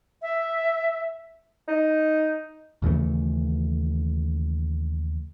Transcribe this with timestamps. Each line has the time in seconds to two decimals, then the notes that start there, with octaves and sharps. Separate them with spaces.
0.22 E5
1.68 D#4
2.82 D#2 C#3 E3 A3